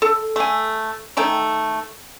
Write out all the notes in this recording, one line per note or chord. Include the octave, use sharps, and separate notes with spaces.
A4
A3 G#5
D#3 A3 G5 A#5